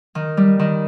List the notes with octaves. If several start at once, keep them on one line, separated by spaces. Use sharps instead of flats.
D#3
G3
D#3